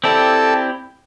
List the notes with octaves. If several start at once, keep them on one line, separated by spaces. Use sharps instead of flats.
C4 E4 G4 A4 D5